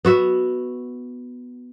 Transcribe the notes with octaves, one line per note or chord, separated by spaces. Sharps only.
B3 F#4 E5